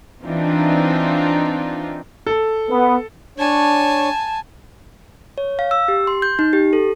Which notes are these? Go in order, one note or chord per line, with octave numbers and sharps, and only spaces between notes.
E3 C4 D4 D#4 F4
A4
B3
D4 C#5 G#5 A5
C#5
F5
E6
G4
C6
G6
D#4
G4
A4